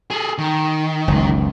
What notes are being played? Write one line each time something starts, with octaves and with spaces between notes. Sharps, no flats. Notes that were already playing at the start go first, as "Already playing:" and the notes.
G#4 A4
D#3
F#1 C#2